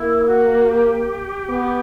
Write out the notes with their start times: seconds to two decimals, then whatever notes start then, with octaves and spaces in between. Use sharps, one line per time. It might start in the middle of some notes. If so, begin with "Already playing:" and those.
Already playing: A#3 E4
0.26 F#4
0.67 G4
1.50 B3